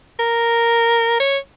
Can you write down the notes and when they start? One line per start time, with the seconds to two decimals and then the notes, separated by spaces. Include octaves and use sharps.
0.19 A#4
1.20 C#5